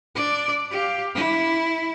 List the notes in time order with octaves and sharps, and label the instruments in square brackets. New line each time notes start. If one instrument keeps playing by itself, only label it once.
[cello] D4 D5
G4 F5
E4